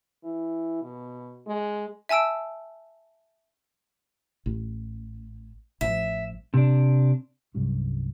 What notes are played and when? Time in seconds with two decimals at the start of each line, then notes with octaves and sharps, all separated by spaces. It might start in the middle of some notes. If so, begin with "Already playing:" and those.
0.24 E3
0.82 B2
1.47 G#3
2.09 E5 G#5 A5 E6 D7
4.46 A1
5.81 A1 F3 E5
6.54 C3 D4
7.54 C2 G2 F#3 C#4